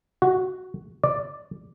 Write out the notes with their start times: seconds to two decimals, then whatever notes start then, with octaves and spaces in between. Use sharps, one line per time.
0.22 F#4
1.04 D5